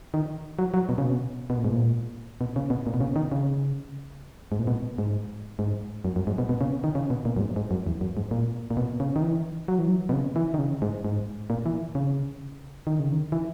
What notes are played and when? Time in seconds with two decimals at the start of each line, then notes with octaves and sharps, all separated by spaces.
0.14 D#3
0.59 F#3
0.74 F#3
0.89 B2
0.98 C#3
1.04 B2
1.50 B2
1.57 A#2
1.64 G#2
1.72 A#2
2.41 B2
2.56 C#3
2.70 B2
2.87 A#2
2.94 B2
3.01 C#3
3.16 D#3
3.32 C#3
4.52 G#2
4.59 A#2
4.67 B2
4.98 G#2
5.59 G#2
6.05 F#2
6.16 F#2
6.27 G#2
6.38 B2
6.49 B2
6.61 C#3
6.84 D#3
6.95 C#3
7.10 B2
7.25 A#2
7.37 F#2
7.40 G#2
7.56 G#2
7.71 F#2
7.87 E2
8.01 F#2
8.17 G#2
8.31 A#2
8.71 A#2
8.77 B2
9.00 C#3
9.16 D#3
9.22 E3
9.68 F#3
9.78 E3
9.88 F#3
10.09 B2
10.13 C#3
10.36 E3
10.54 D#3
10.59 C#3
10.82 G#2
11.05 G#2
11.50 A#2
11.66 E3
11.95 C#3
12.87 D#3
12.99 C#3
13.12 D#3
13.32 E3